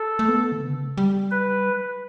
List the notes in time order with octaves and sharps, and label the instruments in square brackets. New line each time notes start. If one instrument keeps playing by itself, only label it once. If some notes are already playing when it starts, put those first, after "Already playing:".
Already playing: [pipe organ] A4
[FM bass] A3
B3
D3
C#3
G3
[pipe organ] B4